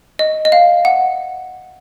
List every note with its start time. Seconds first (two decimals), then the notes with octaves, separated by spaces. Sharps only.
0.19 D#5
0.45 D#5
0.52 F5
0.85 F#5